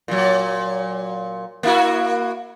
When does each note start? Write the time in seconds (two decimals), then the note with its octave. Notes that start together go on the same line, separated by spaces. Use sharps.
0.08 A#2 F#3
1.63 A#3 E4 F#4